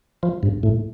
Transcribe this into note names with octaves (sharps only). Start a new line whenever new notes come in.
F3
G2
A2